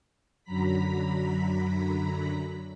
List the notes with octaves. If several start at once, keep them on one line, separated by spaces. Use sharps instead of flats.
F#2 D3 F#3 A#5 B5 B6